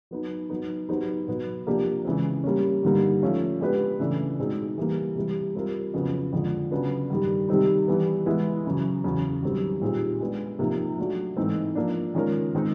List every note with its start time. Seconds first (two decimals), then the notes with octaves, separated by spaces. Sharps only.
0.11 F#3 B3 D#4
0.50 F#3 B3 D#4
0.89 F#3 B3 D#4 G4 C5
1.28 B2 F#3 B3
1.67 C3 F3 A#3 D4 G4
2.05 C#3 E3 G#3 C4
2.44 G3 A#3 C#4
2.83 G2 D3 G3 A#3 D#4
3.23 F3 A3 C#4 F4
3.61 G#3 B3 D4 G4 B4
4.00 C#3 E3 A3 D4
4.39 B2 G#3 C4 D#4 G#4
4.78 E3 G3 A#3
5.15 C3 E3 G3
5.55 G3 C4 F4 A#4
5.94 F2 C#3 F#3 B3
6.32 F2 D3 F3 G#3
6.71 C#3 F#3 B3 D4
7.10 G2 D#3 G3
7.49 C3 D#3 G3 C4 D#4
7.88 E3 G3 B3
8.26 E3 G#3 B3 E4
8.65 F#2 C#3 E3
9.04 E2 C#3 F#3
9.42 F#2 D#3 G3 C4
9.81 A#2 G3 C4 D#4 G#4
10.21 G#3 B3 D4
10.59 C3 F3 A#3 D#4
10.98 F#3 A3 D4 F#4
11.37 G#2 E3 A3 C4 D#4
11.75 F3 A#3 D4
12.14 D#3 G#3 C#4 F4 A#4
12.55 D#3 G#3 C4 D#4